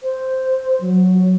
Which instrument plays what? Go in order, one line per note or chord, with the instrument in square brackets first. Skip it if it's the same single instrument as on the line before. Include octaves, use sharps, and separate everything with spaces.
[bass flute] C5
F#3